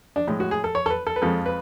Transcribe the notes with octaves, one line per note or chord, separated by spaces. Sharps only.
D4
A2 G#3
F#4
G#4
A4
C#5
A4
B4
A4
B4
F2 F3 G#3 A4
B4